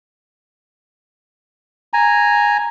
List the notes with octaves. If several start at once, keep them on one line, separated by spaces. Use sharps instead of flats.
G#5 A#5